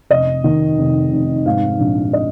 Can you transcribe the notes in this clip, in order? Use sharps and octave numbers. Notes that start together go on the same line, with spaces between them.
F1 D#5
D#3
F1
F1
G#2 F5
A#1
D#5